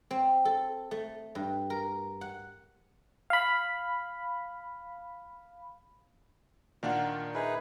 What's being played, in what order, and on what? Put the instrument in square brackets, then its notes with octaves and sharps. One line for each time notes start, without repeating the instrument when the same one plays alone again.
[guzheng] C4
A4
A3
G2
A#4
F#5
[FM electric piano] F5 B5
[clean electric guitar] A#2 A#3 [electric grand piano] D#3 D4 F4 [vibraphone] F5 F#5
[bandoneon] D#4 G#4 B4 [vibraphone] E5